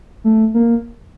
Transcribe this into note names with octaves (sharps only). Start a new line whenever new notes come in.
A3
A#3